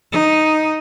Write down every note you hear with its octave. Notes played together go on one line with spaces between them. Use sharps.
D#4